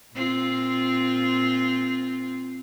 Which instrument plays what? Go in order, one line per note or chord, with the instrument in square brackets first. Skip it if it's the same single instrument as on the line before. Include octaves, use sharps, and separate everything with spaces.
[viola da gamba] A#2 C4 F4